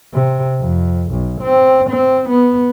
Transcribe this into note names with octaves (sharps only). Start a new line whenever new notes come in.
C3
F2
B1
C4
C4
B3